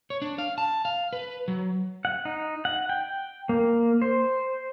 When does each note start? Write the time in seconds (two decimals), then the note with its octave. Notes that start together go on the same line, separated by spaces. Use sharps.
0.10 C#5
0.22 D4
0.38 F5
0.58 A5
0.85 F5
1.13 B4
1.48 F#3
2.05 F#5
2.25 D#4
2.65 F#5
2.89 G5
3.49 A#3
4.02 C5